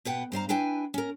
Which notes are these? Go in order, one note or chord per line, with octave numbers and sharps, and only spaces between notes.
B2 B4 F#5 G5
G2 C5 F5 A#5
D4 E4 B4 G5 G#5
C#4 A#4